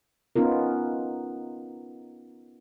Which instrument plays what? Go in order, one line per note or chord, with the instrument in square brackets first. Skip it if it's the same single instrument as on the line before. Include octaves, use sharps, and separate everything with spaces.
[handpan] B3 C#4 D#4 F4 A#4